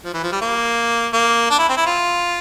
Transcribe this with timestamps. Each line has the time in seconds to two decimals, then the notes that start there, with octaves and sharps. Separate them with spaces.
0.05 F3
0.13 E3
0.23 F3
0.32 G3
0.41 A#3
1.13 A#3
1.50 D4
1.59 E4
1.69 C4
1.77 E4
1.86 F4